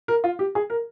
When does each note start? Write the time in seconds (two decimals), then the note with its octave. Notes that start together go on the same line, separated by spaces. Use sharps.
0.08 A#4
0.24 F4
0.39 G4
0.55 G#4
0.70 A#4